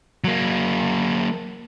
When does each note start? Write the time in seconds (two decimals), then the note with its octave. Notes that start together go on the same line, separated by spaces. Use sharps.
0.24 F#3 A#3